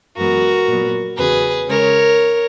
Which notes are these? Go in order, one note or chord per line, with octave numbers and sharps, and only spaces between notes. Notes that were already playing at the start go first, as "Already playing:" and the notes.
F#2 E3 G#3 B3 F#4 A#4
A#2 F#3 B3
E2 C#3 F#3 G#4 B4
C#3 G#3 C#4 A#4 C#5